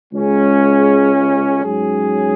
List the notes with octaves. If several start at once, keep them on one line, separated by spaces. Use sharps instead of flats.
C#2 C#3 G#3 C#4
G#2 F#3 C#4 G#4